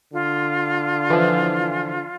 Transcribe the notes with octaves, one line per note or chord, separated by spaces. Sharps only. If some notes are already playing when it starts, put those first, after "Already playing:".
D3 F4
E3 F3